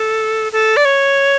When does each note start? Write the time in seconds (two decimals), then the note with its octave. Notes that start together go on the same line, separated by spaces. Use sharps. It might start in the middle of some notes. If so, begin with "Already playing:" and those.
Already playing: A4
0.52 A4
0.77 D5
0.85 C#5